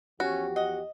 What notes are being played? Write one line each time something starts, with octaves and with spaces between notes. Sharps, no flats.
E2 F3 C#4 F#4 G4
D#5 F#5